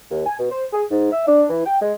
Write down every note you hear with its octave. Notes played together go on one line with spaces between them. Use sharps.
D#2
G#5
B2
C5
G#4
G#2
E5
D4
E3
G5
G#3